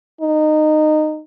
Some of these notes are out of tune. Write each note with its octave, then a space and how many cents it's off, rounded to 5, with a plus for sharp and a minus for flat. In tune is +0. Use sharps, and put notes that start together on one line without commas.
D#4 -20